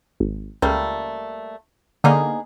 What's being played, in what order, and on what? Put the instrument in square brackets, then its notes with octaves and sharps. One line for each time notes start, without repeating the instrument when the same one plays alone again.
[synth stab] G#1
[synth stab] C#2 [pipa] G3 A3 A#3
[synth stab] D3 A#3 [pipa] B3 D#4 G#4